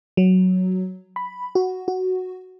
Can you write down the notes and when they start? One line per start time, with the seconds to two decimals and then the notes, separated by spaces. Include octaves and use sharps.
0.17 F#3
1.16 B5
1.55 F#4
1.88 F#4